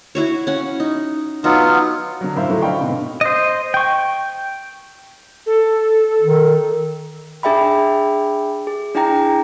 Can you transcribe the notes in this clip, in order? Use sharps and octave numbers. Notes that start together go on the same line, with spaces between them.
E4 F#4 C#5
C#4 F#5
D#4
F#3 B3 D#4 F4
D3 F#3
F#2 A2 E4 C5 F5
A2 D3 F3 F#3 A3
D5 D#5 F5 G5 B5 C#6
G#2 B2 D3 C4
C5 D#5
G5 C#6
A4
D#3
D4 G#4 E5 G5 B5
G#4
D4 E4 G#4 G5 A#5 A#6